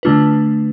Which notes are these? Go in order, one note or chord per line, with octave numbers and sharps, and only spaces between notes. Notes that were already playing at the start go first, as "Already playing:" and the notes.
D3 A3 D4 F4 B4